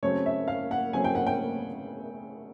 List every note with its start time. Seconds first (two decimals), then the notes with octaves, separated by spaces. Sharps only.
0.03 C#3 F#3 A3 C4 C#5
0.26 E5
0.48 F5
0.71 F#5
0.93 C#3 F#3 A3 C4 G#5
1.04 G5
1.15 F#5
1.26 G5